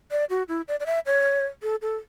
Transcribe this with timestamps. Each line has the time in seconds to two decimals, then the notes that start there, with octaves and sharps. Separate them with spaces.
0.11 D5
0.30 F#4
0.48 E4
0.68 D5
0.80 D5
0.86 E5
1.06 C#5
1.63 A4
1.82 A4